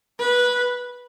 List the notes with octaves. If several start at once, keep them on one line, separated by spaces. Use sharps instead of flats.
B4